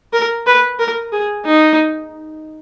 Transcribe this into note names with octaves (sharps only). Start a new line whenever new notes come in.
A#4
B4
A#4
G#4
D#4